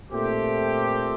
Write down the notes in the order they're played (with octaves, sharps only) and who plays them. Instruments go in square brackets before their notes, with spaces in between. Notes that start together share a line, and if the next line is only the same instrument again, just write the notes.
[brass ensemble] A#2 A3 C4 G4